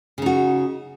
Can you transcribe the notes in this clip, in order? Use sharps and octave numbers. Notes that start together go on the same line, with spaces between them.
C#3 D#4 F#4